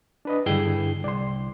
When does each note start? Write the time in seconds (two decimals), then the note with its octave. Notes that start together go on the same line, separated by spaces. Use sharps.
0.25 D4 B4 D#5
0.46 G2 D3 E4 G#4 G5
1.04 C2 D5 C6